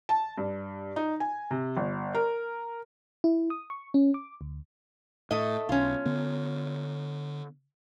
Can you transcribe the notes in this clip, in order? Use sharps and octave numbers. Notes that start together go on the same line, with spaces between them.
A5
G2
D#4
G#5
C3
G1
A#4
E4
D#6
C#6
C#4
D6
D2
A2 A3 D#5
B1 C#4 F4
D3 B3